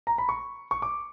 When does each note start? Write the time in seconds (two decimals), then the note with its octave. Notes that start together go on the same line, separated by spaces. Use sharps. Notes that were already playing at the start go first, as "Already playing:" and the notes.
0.07 A#5
0.18 B5
0.29 C#6
0.71 C#6
0.82 D6